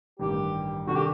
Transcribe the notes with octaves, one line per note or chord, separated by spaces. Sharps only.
A1 G2 D#3 G4
C3 D#3 G3 D4 F#4 A4
G4